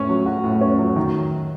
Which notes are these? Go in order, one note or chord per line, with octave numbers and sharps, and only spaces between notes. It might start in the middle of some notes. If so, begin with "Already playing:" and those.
Already playing: A2 C#4
F#3
F#4
A2
C#4
F#3
D#3